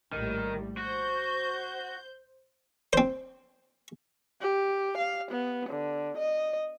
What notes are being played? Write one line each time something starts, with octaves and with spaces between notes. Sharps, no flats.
A#1 A2 D#3 G3
F#4 C5 G6
C4 C5
G4
F5
B3
D3
D#5